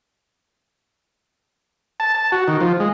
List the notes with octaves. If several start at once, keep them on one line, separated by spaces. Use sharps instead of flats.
A5
A5
F#4
D#3
F3
G#3